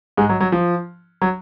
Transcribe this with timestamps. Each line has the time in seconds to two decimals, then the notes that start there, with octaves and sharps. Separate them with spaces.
0.17 G#2 G#3
0.29 F#3
0.40 F#3
0.52 F3
1.22 F#3